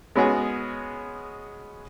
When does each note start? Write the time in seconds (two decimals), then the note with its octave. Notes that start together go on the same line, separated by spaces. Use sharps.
0.16 G#3 B3 C#4 F#4 G#4